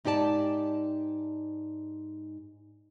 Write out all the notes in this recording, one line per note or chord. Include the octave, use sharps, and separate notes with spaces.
G#2 D#4 G4 D5 A5